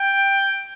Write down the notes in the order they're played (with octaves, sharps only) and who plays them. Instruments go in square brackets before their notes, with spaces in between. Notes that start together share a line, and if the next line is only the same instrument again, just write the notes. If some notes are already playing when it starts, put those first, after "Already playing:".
Already playing: [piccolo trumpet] G5